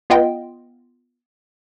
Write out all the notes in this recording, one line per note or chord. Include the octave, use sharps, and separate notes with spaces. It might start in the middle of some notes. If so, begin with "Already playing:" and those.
B3 F4 D#5 G5